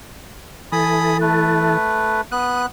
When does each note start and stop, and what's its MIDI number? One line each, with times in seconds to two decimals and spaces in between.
0.72 1.77 52
0.72 1.77 69
0.72 1.17 80
0.72 1.17 83
0.72 1.17 87
1.21 2.21 57
1.21 2.21 71
2.32 2.66 59
2.32 2.62 87
2.32 2.66 90